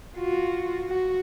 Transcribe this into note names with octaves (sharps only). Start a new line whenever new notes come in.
F4 F#4
F#4